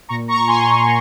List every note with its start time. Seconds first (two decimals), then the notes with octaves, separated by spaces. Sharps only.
0.09 A#2 A#5 C#6
0.28 A#5 C#6
0.47 A#2 G#5 C6